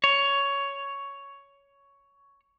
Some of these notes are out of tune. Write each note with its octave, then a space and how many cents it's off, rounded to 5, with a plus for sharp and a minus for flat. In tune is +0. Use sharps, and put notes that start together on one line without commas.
C#5 +10